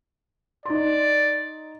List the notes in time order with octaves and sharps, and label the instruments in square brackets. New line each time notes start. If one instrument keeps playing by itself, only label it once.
[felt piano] D#4 C6 [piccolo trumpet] D5